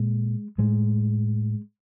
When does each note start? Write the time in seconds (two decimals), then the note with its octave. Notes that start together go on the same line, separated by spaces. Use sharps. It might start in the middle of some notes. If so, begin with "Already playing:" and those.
Already playing: A#2 G#3
0.58 A2 G#3